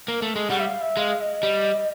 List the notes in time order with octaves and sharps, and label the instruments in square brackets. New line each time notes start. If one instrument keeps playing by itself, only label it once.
[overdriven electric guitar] A#3
A3
G#3
[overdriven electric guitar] G3 [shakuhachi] F#5
[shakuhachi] E5
F5
E5
[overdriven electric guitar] G#3 [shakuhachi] F5
[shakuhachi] D#5
[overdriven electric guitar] G3